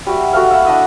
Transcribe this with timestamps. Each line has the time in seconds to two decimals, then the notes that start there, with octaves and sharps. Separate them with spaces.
0.07 G3 F#4 E5
0.33 F#4 A4 E5 F5
0.51 E5 F#5 B5
0.65 D4 E4 D#5 E5